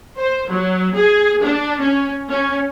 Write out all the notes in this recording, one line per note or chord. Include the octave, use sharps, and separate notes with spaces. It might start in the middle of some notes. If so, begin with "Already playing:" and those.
C5
F#3
G#4
D4
C#4
C#4